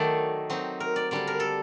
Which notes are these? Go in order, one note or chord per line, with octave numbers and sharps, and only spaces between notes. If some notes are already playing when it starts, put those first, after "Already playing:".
Already playing: D#3 F#3 A3 D#4 D5
F#3 C4 D#4
A#4
D5
D3 G3 D4 D5
A#4
A4